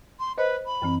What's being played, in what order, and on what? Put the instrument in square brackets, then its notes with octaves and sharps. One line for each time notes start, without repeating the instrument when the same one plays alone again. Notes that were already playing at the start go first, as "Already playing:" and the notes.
[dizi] C6
[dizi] B4 [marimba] C5 D#5
[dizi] B5
[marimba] F#2 E3 C4